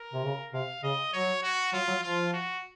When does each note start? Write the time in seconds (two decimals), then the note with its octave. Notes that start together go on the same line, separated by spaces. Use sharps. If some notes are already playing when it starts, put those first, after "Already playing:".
Already playing: A#4
0.13 C3
0.24 C#3
0.53 C3 F5
0.83 C#3 D#5
1.13 F#3 C#5
1.43 F#4
1.73 F#3 F4
1.88 F#3
2.03 F3 F4
2.33 F#4